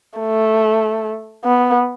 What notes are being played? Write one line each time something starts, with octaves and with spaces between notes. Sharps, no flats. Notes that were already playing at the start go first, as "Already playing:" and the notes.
A3
B3